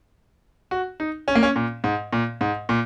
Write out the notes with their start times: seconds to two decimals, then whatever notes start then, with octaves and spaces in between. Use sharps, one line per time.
0.71 F#4
1.00 D#4
1.28 C#4
1.35 A#3
1.43 C#4
1.56 A#2
1.84 G#2
2.13 A#2
2.41 G#2
2.69 A#2